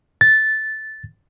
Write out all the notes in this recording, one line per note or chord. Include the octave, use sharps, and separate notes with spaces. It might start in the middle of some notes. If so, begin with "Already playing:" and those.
A6